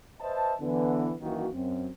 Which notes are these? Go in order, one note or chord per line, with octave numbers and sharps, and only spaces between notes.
B4 C5 D#5 E5 A5
D3 E3 B3
F#2 D#3 E3 A#3 F#4
F#2 C4